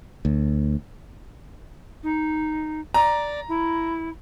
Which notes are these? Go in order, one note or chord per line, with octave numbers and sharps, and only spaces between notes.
D2
D#4
D5 A#5
E4